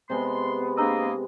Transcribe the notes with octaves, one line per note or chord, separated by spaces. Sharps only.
C3 G#3 B3 C6
A#3 D4 G#4 D#5 A#5 E6